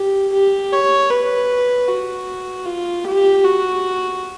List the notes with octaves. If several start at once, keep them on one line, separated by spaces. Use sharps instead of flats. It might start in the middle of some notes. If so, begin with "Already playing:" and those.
Already playing: G4
G4
C#5
B4
F#4
F4
G4
F#4